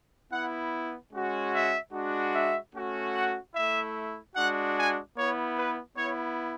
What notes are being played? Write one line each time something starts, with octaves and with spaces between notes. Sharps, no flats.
B3 E4 F#5
G#3 C#4 F#4
E5
G#3 D4 F#4
E5
A3 C#4 F#4
F#5
A3 E4 E5
G#3 D4 F#4 F#5
G#5
B3 E4 C#5
B4
B3 E4 C#5